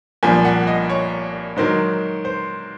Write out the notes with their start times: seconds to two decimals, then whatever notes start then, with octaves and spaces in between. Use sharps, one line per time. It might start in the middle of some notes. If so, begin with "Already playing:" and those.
0.23 C2 A#2 F3 G#5
0.45 F#5
0.67 D#5
0.89 C#5
1.56 G#2 D#3 F#3 C5
2.25 C5